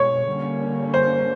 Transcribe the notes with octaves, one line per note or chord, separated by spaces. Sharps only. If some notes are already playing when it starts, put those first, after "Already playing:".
Already playing: B2 G#3 C#5
D3 G3 A#3 C#4
C5